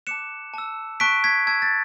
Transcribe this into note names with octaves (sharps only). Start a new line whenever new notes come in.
A5 D6 F#6 C#7 E7
A5 E6
A5 C#6 F#6 B6 D7
G#6 B6
A5 E6 G#6
A6